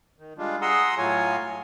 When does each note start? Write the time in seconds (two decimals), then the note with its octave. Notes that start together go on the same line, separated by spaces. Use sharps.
0.19 D#3
0.38 G3 G#3 D4 F4
0.61 G#4 F#5 A#5 C6 D#6 E6
0.98 A2 F#3 F4 C#5 G#5